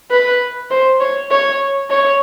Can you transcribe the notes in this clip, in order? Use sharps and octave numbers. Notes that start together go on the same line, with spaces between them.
B4
C5
C#5
C#5
C#5